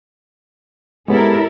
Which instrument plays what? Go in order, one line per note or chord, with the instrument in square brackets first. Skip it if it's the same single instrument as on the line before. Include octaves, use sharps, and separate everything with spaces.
[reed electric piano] G#3 B3 [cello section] E4 A4 A#4 [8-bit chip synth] G4 C#5